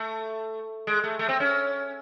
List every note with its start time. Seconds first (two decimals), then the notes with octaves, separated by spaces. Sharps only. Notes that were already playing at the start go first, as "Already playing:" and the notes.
Already playing: A3
0.87 G#3
1.04 A3
1.19 A3
1.29 C4
1.40 C#4